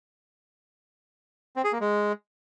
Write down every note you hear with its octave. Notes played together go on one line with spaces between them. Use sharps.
C4
G#4
A#3
G#3